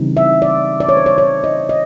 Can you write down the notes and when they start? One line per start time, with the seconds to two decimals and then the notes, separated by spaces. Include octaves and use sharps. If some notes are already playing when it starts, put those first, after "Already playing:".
Already playing: C#3 E3 G3 C4 D#4
0.17 E5
0.42 D5
0.80 D5
0.89 C#5
0.97 C5
1.06 C#5
1.18 C#5
1.44 D#5
1.69 D#5